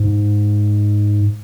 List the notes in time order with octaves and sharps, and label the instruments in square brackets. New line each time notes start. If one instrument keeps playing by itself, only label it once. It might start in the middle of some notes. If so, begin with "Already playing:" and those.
Already playing: [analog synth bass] G#2